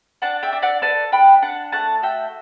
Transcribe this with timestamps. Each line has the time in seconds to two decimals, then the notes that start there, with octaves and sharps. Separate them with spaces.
0.22 D4 F#5 A5
0.43 E5 G5
0.53 D4
0.62 D5 F#5
0.82 A4 B4 D5
1.12 D4 G5 B5
1.42 D4 F#5 A5
1.72 A3 F#5 A5
2.02 F#4 E5 G5